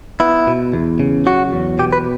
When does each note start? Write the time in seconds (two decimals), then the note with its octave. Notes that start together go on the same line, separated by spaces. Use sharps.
0.20 B3 E4
0.47 B2
0.73 E2
1.00 C#3
1.26 F#3 F#4
1.53 E2
1.79 B2 G4
1.93 B4